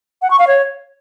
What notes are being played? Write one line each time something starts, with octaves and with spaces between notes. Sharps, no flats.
F#5
C#6
F5
C#5